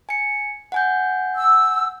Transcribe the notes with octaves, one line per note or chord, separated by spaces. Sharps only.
G#5 C#7
F#5 G#5 G6
E6